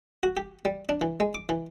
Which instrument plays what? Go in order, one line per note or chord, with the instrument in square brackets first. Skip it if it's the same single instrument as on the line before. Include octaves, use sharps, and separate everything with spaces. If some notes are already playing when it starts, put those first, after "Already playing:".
[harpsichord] F#4
G4
G3
D4
E3
G#3
D6
E3